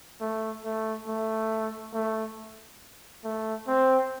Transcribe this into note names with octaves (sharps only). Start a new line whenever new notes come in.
A3
A3
A3
A3
A3
C4